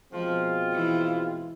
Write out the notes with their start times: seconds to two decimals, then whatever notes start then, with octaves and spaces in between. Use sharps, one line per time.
0.12 B2 F3 G#3 C4 F4
0.73 E3